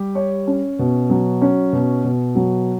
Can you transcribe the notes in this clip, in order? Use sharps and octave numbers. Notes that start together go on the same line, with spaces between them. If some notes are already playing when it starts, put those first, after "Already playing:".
Already playing: G3 G4
C#5
C#4
B2
F#3
C#4
B2
B2
F#3